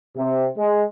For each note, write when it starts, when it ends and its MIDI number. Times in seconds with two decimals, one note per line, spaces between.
0.17 0.47 48
0.57 0.84 56